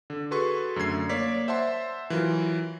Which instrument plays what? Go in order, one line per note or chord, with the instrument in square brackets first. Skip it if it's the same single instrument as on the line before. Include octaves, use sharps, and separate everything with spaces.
[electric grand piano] D3
F#4 G#4 A4 B4 C6 C#6
F#2 D3 A3 G#6 C7
A#3 C#5 D5 B6
C5 E5 F#5 A5 C6
E3 F#3 F4 A#4